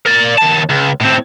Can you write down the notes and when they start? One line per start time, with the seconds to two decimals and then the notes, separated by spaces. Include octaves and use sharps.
0.06 A#4 D5
0.38 D#2 A5
0.69 C#2
1.01 A2 C4